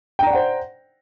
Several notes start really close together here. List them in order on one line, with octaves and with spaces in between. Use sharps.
G5 A#5 D5 F#5 C5